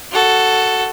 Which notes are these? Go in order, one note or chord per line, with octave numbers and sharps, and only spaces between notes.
F#4 A4